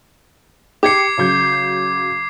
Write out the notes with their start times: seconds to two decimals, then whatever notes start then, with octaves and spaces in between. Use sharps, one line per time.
0.83 G4 D6 G#6 C7 C#7
1.18 C#3 F#3 G6